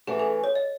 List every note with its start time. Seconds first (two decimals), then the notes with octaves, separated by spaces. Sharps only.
0.07 E3 A3 C#4 F#4 G#4
0.19 A4
0.44 C#5
0.55 D#5